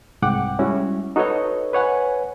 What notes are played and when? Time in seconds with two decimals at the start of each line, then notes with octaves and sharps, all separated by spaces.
0.22 C2 G#2 F#5 G5 D6
0.59 G3 G#3 C#4 E4 F#4
1.16 D#4 F#4 A4 B4 C#5 D#5
1.73 B4 C#5 F#5 G#5